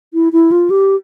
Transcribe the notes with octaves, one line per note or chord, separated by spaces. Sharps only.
E4
E4
F4
G4